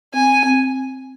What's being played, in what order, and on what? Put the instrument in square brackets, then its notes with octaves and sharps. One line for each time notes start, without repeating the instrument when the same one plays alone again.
[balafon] C4 [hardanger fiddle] G#5
[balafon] C4